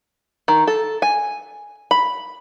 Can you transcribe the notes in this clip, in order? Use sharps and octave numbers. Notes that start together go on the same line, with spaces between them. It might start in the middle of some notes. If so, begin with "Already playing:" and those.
D#3
A4
G#5
B5